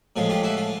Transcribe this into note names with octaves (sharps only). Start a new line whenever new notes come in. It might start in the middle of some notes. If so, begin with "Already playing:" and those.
A2 F3 G#3 F4
F4 G4
E4 F#4
F4